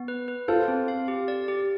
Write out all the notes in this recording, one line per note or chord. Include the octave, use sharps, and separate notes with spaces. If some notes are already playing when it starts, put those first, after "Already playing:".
Already playing: B3
B4
B4
F4 A4 C5
C4
F5
G4
D5
G4